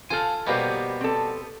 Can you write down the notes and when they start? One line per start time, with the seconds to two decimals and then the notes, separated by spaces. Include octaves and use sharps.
0.10 F4 A4 C5 F5 G#5
0.47 B2 G3 A#3 B3 G4 C5
1.01 C4 A4